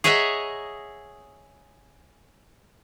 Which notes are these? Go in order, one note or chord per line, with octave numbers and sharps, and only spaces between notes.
G#4 C#5 D#5 E5 F#5 A#5